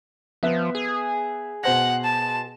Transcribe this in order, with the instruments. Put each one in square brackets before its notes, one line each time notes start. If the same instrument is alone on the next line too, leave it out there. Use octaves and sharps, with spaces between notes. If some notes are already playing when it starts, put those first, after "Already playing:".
[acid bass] F3 [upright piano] B3 E5 F#6
[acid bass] G#4
[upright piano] B2 C5 A#6 [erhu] F#5
[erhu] A5